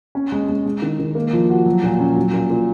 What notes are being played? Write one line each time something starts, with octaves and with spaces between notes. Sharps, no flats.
C#4
G#3
G#3
G#3
D#3
D#3
A#3
F3
F#4
F#3
A#2
C#4
F#3
A#2
A#2